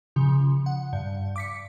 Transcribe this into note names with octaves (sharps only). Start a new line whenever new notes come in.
C#3 F3
F#5
G2
D6 B6 C#7